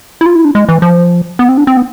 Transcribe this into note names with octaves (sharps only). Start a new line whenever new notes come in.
E4
F4
E4
D4
G#3
E3
F3
B3
C4
D4
C4
B3